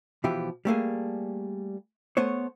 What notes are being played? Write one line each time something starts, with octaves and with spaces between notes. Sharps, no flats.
B2 E3 F3 G4
G3 A3 A#3 G#4
A3 B3 C5 C#5